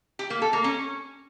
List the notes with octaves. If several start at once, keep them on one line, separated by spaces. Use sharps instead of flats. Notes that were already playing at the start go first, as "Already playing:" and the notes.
G4
A#3
A4
A#3
C#4